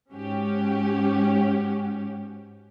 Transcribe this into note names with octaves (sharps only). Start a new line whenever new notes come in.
G#2 C#4 F#4 G4